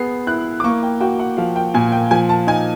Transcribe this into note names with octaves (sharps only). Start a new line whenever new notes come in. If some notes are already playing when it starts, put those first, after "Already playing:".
Already playing: B3 G#4 C7
E4 F#6
D6
A#3 C#6
G5
F#4 G5
F#5
F3 F5
G5
A#2 G#5
G5
F3 G#5
A5
D#4 G#5